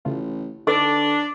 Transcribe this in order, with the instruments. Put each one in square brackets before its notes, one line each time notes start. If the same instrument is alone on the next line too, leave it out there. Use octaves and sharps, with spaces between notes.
[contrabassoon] A1 [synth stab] C#3 A3 F4
[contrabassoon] D3 [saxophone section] D4 [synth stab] D#4 A4 B4 [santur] D5